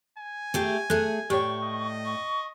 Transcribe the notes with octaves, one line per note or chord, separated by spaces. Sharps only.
G#5
A3 G4 G#4
A3 G#4 A4 F#6
A2 G4 C#5 D5 G5 C#6
D#5
C#6